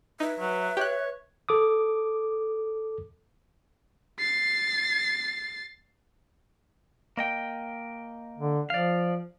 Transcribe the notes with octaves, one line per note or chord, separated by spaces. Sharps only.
D#4 B4 E5
F#3 B4
G4 C#5 F#6
A4 D6 D#6
A6 C7
A#3 D#5 G5
D3
F3 D5 F5